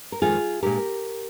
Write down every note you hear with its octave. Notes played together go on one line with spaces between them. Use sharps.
A#4
F2 D#3 G#3 F4 G#4
A#2 G#3 D4 G4 A#4